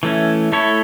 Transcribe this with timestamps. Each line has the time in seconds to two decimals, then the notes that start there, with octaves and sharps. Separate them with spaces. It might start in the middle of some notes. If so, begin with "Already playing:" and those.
0.03 E3 A3 C#4
0.52 A3 E4 A4 C#5